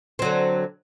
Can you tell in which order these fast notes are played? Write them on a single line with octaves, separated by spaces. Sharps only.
C4 F#3 D3